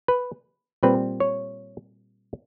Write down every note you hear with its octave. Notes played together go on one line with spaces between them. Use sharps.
B4
A#2 G3 C4 B4
C#5